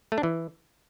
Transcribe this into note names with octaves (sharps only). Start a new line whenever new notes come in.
A3
D4
E3